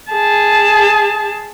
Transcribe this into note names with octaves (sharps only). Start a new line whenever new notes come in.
G#4 A5